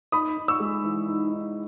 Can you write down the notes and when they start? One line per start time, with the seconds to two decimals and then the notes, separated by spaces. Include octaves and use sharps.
0.12 D#4 B5 D#6
0.37 D#4
0.48 C#6 E6
0.60 G#3
0.84 E3
1.08 D#4
1.31 D#4